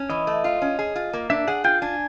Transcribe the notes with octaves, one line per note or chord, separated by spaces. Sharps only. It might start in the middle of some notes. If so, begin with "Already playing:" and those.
Already playing: C#4
E3 D#5
A3
F4
C#4
G#4
F4
A#3
D4 E5
G#4 F#5
F4 G5
D4 G#5